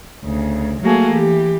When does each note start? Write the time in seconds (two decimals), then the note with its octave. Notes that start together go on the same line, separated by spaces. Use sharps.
0.24 D2 C#3
0.81 F#3 A3 A#3 F#4 G#4 A4
1.10 E3 G4